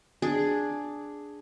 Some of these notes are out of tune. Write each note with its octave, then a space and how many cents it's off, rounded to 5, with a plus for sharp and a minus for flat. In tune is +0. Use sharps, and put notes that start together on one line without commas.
D4 +0 G#4 +0